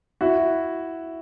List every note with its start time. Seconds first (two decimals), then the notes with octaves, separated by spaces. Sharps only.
0.21 E4 F#4